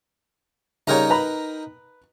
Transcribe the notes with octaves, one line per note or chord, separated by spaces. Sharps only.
C#3 G3 D#4 A#4 C#5 G5
B4 A#5 B5